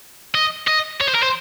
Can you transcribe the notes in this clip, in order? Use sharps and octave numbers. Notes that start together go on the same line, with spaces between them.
D#5
D#5
C#5
C5
A#4
C5